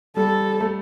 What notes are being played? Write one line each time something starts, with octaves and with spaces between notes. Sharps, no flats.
G3 A4
A3